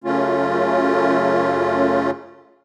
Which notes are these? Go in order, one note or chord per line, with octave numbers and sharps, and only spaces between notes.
F#2 C#3 A3 C#4 F4